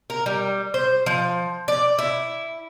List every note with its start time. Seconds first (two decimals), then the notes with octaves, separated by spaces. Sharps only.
0.10 A#4
0.26 G3
0.74 C5
1.06 F3
1.68 D5
1.99 E4